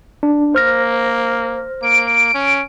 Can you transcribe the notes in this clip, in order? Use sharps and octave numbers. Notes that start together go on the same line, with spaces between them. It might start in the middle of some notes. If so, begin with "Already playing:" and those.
D4
A#3 C5 F6 A#6
A#3 D7
C#4